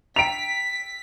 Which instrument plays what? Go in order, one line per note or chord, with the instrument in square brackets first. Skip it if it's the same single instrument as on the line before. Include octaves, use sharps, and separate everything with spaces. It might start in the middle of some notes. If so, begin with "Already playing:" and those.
[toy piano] G5 A#5 [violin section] B6 [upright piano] D7 F7